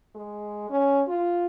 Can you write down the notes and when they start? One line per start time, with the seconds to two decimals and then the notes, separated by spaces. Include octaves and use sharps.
0.15 G#3
0.70 C#4
1.08 F4